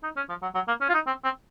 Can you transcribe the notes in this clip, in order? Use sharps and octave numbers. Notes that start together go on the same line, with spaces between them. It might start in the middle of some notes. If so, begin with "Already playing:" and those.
D#4
C#4
F3
F#3
F#3
A#3
C#4
F4
D#4
C4
C4